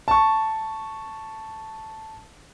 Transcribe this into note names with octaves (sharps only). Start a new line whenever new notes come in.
A5 C#6